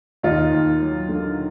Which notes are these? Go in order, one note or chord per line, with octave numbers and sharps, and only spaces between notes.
D#2 D#4 F4
D#2
F#3
D3